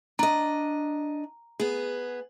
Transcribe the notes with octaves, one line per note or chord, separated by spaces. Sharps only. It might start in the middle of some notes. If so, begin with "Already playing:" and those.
D4 D#5 A#5
B3 G#4